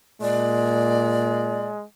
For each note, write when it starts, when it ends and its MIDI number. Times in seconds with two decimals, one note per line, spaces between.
0.22 1.77 46
0.22 1.84 56
0.22 1.66 74